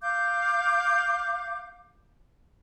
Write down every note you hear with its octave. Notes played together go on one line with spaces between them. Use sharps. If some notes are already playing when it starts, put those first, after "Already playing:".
F5 D6 G6